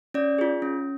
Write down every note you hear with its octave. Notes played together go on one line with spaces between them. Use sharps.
C#4 D5
F4 G#4
C#4